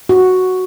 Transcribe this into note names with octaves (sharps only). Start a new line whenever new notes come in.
F#4